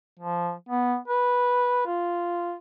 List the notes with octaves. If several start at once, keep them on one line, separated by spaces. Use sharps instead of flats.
F3
B3
B4
F4